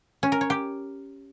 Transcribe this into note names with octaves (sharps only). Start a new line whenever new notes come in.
C#4
A#4
C#5
G4